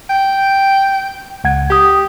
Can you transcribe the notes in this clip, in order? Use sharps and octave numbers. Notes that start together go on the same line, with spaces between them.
G5
C#2 F#5 G#6
G4 G5 D#6